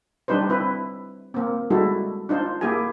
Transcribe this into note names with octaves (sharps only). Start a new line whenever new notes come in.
G3 D4 D#4 B4 C5
C4 E4 B4
A#3 C4
G3 G#3 D#4 E4 F#4 A4
D4 D#4 F4 C5
A#3 E4 G4 G#4 G#5